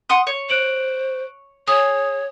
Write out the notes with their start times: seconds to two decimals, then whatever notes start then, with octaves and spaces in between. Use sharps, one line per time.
0.09 F#5 C6 D#6
0.27 C#5
0.49 C5 F#6 D7 F#7
1.68 G#4 C#5 D#6